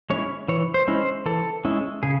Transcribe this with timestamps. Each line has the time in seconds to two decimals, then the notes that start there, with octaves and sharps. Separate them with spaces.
0.10 G#3 C#4 E4 C#5
0.48 E3 C#5
0.74 C5
0.88 G#3 C#4 E4
1.00 C5
1.26 E3 A4
1.65 G#3 C#4 E4
2.03 C#3 G#4